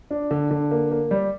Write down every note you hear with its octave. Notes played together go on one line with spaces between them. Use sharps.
D4
D3
D3
A#3
A#3
G3